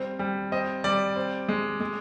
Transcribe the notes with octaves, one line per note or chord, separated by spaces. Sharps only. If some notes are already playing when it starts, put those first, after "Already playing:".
Already playing: G3 C4
G3
C4 D#5
G3 D5
C4
G#3
G#3